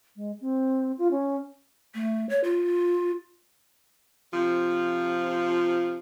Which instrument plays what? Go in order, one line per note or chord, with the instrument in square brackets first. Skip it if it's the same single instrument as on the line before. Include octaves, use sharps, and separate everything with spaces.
[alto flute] G#3
C4
F4
C#4
[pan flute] A3
C#5
F4
[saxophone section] C3 F3